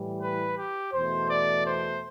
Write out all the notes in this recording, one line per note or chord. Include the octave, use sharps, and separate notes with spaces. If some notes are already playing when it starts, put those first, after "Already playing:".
Already playing: A2 E3 G3
B4
G4
E2 B2 A3 C5
D5
C5